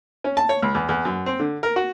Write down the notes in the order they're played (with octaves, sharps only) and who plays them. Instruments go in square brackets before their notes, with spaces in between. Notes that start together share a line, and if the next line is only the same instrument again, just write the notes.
[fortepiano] C#4
A5
C#5
C#2
E2
E2
F#2
C4
D3
A#4
F#4